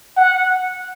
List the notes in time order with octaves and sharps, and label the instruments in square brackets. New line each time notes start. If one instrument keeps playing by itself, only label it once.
[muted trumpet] F#5